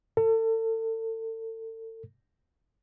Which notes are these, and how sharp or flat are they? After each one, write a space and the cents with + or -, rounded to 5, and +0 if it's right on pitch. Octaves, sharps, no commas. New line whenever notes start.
A4 +35